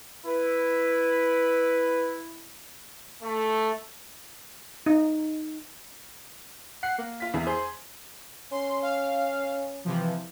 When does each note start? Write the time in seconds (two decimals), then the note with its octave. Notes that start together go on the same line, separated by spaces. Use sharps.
0.25 E4 B4
3.21 A3
4.86 D#4
6.83 F#5 C7
6.98 A#3
7.20 F4 B6
7.34 E2 E4
7.47 G#4 C5
8.52 C#4 C6
8.82 F5
9.85 C3 E3 F3